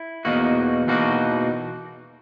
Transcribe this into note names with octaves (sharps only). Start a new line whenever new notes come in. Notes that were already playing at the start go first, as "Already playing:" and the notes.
Already playing: E4
E2 B2 A#3 D#4 F#4
E2 B2 A#3 D#4 F#4